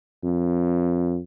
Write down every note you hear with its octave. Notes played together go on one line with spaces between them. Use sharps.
F2